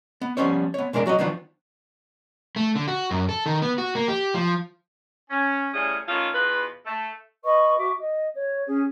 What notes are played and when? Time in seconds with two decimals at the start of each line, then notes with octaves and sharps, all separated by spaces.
0.21 B3
0.37 F3 G3 B3 C#4 C5 C#5
0.74 B3 C#5
0.93 B1 G#3 D4 A#4 D5
1.06 F#3 F#4 C#5 D#5
1.19 D#3 F3 F#3 B3 D4 F4
2.56 A3
2.75 D3
2.88 F#4
3.11 F#2
3.29 A4
3.46 D#3
3.62 B3
3.78 F#4
3.95 A#3
4.08 G4
4.34 F3
5.30 C#4
5.74 A2 C#3 G3 A3 C#4 G#4
6.08 D#3 A3 C#4 F4
6.34 E2 B2 F4 B4
6.86 A3
7.44 B4 D#5 B5 C#6
7.78 F#4 E5 C#6 D6
7.99 D#5
8.34 C#5
8.66 C#4 G#4